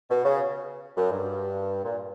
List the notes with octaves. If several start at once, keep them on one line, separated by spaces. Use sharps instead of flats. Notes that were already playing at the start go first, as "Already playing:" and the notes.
B2
C#3
F#2
G2
A#2